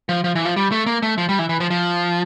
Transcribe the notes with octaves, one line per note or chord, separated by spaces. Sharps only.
F3
F3
E3
F3
G3
A3
A#3
A3
F3
G3
E3
E3
F3
F3